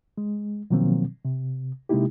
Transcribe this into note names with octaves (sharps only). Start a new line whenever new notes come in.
G#3
B2 D#3 F3 F#3 A#3 C4
C3
C3 G#3 A#3 D#4 E4 G4